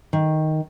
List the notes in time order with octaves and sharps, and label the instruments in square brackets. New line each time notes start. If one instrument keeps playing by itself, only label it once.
[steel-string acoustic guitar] D#3